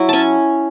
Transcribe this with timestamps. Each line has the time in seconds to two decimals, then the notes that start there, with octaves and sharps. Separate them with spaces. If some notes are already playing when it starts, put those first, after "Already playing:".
Already playing: F#3 E4
0.09 C#4 G#5 A5